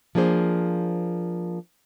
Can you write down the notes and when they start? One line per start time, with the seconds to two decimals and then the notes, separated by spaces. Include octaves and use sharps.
0.15 F3 A#3 D4 G#4 C5